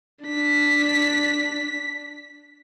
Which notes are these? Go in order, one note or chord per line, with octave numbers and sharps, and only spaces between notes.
D4 B6